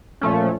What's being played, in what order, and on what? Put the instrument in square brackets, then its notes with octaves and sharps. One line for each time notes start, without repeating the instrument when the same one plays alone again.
[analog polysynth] A#2 F3 A3 C#4